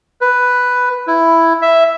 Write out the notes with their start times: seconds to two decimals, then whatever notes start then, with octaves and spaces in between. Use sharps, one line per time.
0.21 B4
1.07 E4
1.62 E5